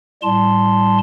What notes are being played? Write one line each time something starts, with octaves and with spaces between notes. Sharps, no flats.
A2 G3 A5 C6